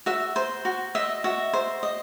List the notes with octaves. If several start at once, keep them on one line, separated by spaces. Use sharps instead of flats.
F#4 E5
C5
F#4
D#5 E5
F#4 E5
C5
D#5